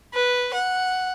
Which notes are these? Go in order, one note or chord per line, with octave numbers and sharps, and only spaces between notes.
B4
F#5